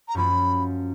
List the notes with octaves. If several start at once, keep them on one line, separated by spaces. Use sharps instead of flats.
A#5
F#2 F3 A#3 C#4 F4 B5